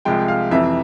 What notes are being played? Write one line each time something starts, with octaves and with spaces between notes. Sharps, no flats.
C2 C3 F3 G#3 G5
F5
F2 C3 E3 E5